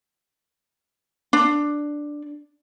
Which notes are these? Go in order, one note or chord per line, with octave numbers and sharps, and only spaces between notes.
D4